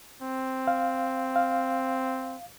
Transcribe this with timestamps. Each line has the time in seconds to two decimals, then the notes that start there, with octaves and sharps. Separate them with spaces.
0.22 C4
0.67 F5
1.36 F5